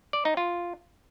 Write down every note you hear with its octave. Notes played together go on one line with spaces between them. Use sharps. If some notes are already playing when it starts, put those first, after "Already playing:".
D5
D#4
F4